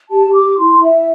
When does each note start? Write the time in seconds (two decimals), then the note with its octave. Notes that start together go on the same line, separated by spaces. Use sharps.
0.10 G4 A5
0.26 G4
0.33 D6
0.42 G4
0.58 E4 C6
0.75 E4
0.83 E5
0.91 E4